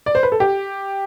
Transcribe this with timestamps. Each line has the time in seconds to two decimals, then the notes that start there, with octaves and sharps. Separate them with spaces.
0.06 D5
0.15 C5
0.23 B4
0.32 A4
0.40 G4